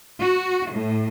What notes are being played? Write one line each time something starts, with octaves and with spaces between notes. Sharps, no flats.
F#4
A2